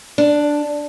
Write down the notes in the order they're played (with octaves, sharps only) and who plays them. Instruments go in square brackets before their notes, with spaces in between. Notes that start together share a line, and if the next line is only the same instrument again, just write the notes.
[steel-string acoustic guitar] D4